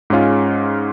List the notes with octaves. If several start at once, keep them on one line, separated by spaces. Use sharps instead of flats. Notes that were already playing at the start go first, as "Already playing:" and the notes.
G#2 G#3 C#4 F4